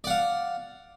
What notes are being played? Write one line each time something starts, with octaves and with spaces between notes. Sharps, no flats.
D5 F5 F#5